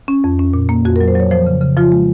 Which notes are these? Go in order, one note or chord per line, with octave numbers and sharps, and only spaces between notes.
C#4
F2
C#4
A#2
A#3
F2 F#4
F#3 A#4
C5
F#3 C#5
F3 C5
C#3
C#3
F3 F4
G#3